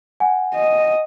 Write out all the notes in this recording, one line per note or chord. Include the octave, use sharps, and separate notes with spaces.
F#5 G#5
D#5